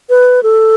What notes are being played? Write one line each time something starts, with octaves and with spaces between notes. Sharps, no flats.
B4
A4